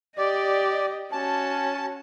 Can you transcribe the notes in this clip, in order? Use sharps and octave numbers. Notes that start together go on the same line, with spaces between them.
G4 D5 D#5
C#4 F#4 A5